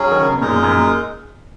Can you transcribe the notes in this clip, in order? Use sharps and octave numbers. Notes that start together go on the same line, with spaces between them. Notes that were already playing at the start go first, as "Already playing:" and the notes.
Already playing: G#2 F#3 C#4 G#4
D#3
C#3
B2
F#2 A#2 G#3 D#4 A#4
F#2 A#2